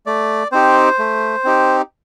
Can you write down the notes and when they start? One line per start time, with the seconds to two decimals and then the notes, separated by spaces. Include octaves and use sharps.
0.06 A3 D5
0.52 C4 D#4 G4 C5
0.99 A3
1.45 C4 D#4 G4